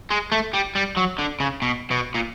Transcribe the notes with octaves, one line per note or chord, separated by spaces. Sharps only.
G#3
A3
G3
G3
F#3
D3
C#3
B2
B2
A#2